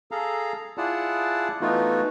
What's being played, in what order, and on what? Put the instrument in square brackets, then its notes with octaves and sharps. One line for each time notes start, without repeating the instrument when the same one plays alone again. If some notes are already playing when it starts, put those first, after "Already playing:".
[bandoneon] G#4 A4 F5 A#5
E4 F4 G#4 D5 F#5 A5
E3 A3 B3 D#4 F4 F#4